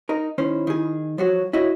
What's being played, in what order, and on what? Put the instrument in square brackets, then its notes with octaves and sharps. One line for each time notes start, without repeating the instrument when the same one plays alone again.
[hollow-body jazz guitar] D#4 A#4
[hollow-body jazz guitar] D#3 C#4 C5 [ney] E4
[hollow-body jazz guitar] D#3 G#4
[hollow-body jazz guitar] F3 F#3 F#4 [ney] C#5
[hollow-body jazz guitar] E4 F#4 D#5 [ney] C#5